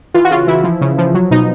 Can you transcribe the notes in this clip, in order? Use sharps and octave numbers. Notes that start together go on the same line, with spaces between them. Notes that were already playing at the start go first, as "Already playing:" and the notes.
E3 F4
F#4
C#3 F4
E3 E4
F3
C#3
F3
F#3
B2 D#4